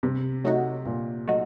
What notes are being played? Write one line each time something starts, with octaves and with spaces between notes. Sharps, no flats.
G2 C3
F#3 A3 D#4 F#4
G2 A#2
F#3 A3 D#4 F#4